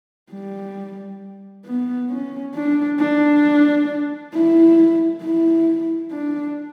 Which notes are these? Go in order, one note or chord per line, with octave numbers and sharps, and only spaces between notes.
G3
B3
C#4
D4
D4
E4
E4
D4